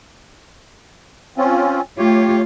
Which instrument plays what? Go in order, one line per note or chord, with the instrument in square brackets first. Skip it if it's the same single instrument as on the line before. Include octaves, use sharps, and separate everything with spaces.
[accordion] C4 C#4 F4
[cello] A3 F4 [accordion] G4 C#5